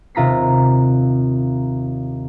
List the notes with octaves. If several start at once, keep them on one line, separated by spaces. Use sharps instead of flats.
D#2 C3 F4 A#5 B6 C7